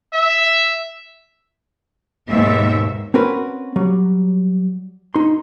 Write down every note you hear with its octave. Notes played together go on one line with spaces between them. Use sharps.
E5
D#2 G#2 B2 E5
C4 C#4 F#4 A#4 B4
F#3 G3
D#4 C6